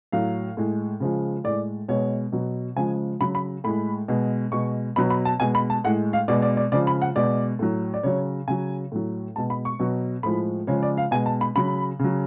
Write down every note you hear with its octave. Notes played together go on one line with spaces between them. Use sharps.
A2 F#3 F5
A2 G#3
C#3 F3 G#3
A2 G#3 D5
B2 G#3 C#5
B2 F#3
C#3 F3 G#3 G#5
C#3 F#3 B5
B5
A2 G#3 B5
B2 G#3
B2 G#3 C#6
B2 F#3 B5
B5
A5
B2 G#3 G#5
B5
A5
A2 G#3 F#5
F5
B2 G#3 D5
D5
D5
C#3 F3 G#3 D5
B5
F#5
B2 G#3 D5
A2 F#3
D5
C#3 F#3 C#5
C#3 F#3 G#5
A2 F#3
B2 G#3 A5
B5
C#6
B2 F#3
A2 F3 G#3 B5
C#3 F3 G#3 C#5
D5
F5
B2 G#3 G#5
A5
B5
C#3 F#3 B5
C#3 F#3